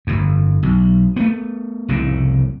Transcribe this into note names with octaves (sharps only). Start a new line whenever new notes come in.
G1 F2
B1
A3 B3
F1 C2 A2 C#3